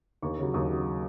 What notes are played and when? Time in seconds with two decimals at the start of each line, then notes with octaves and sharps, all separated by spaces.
0.22 D#2 C#6
0.38 C#3 F#3
0.54 D#2 D#6
0.69 C#3 F#3